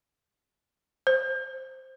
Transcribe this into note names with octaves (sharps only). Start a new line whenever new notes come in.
C5